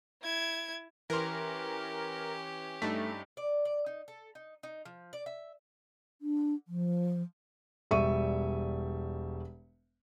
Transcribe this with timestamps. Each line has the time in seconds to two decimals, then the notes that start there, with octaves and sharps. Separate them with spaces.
0.22 E4 G#6
1.10 E3 C#4 G4 A#4 C6
2.82 G2 A3 D#4 B6
3.37 D5
3.65 D5
3.86 D#4
4.08 A4
4.35 D#4
4.63 D#4
4.85 F3
5.13 D5
5.26 E5
6.22 D4
6.68 F3
7.91 E1 G3 E5 C#6 D#7